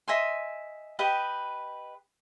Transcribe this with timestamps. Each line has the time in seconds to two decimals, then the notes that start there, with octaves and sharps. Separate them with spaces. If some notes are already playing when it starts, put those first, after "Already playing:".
0.08 D#5 E5 G#5 C6
0.99 G4 B4 D#5 G5